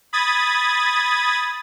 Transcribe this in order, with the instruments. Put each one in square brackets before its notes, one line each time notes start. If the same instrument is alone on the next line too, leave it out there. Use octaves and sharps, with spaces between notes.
[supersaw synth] B5 D#6 G#6 A6